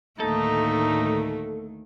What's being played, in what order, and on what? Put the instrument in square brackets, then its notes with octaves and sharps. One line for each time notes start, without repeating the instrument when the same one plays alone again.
[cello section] D2 A2 D#3 [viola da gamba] A3 A#3 [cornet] D#4 [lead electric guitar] A4